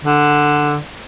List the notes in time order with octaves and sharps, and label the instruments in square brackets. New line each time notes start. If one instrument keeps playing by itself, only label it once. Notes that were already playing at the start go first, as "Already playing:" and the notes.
[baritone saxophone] D3